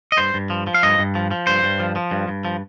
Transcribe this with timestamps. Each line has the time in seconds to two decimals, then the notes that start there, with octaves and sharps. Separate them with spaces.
0.12 D#5
0.18 G2 C5
0.34 G2
0.50 F3
0.67 F3
0.74 F5
0.83 G2 D#5
0.98 G2
1.15 F3
1.31 F3
1.47 G2 C5
1.63 G2
1.80 F3
1.96 F3
2.11 G2
2.28 G2
2.45 F3